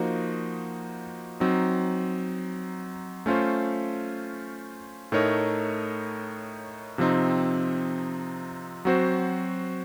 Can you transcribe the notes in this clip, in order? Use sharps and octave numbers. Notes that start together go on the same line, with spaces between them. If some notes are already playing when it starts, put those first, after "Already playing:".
Already playing: F3 A#3 D#4 F#4 C5
F#3 C4 D#4
A3 C#4 F4 C5
A2 A3 D#4 A#4 C#5
C3 F3 C4 D#4
F#3 C4 F#4 C5